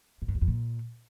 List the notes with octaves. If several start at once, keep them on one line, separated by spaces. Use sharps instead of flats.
G#2
G2
E2
F2
A#2